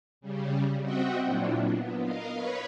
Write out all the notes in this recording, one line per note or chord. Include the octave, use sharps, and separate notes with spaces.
C#3 G3
C4 F#4 D#5 E5 F#5 G5
A#2 F#3 D4 E4 F4
B3
A#4 D#5 F5
B4 C#5 B5